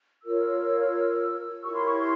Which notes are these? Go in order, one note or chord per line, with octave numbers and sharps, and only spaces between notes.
F4 A#4 C#5 E6
E4 G4 A#4 C#5 C#6
C6
C#6
C6